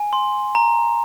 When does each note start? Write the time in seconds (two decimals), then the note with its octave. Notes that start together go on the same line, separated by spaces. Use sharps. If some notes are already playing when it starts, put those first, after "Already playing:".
Already playing: G#5
0.13 C6
0.55 A#5